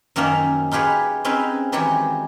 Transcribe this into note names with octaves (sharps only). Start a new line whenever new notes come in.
F#2 D#3 F3 A#3 C#4 E5
D#4 F4 G4 G#4 B4 C#5
C4 C#4 D#4 G#4 B4
D#3 E3 F#3 G#3 G4 G#4